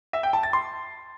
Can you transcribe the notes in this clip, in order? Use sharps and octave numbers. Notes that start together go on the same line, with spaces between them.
E5
G5
A5
A6
C6